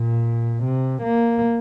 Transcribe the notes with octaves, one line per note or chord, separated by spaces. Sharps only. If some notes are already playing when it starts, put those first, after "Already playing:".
Already playing: A#2
C3
A#3